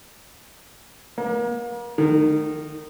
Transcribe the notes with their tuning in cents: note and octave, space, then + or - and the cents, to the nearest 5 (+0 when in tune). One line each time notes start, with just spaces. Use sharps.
A#3 +40
D#3 -20